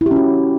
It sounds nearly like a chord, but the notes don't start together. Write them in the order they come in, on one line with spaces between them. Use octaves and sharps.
E4 G4 C#4 F#4